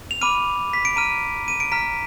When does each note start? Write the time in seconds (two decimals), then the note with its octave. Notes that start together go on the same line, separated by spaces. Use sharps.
0.11 F7
0.21 B5 D6 F6 D#7
0.73 B6
0.85 D7
0.96 A#5 F6 D#7
1.48 D#7
1.60 D7
1.72 A#5 F6 B6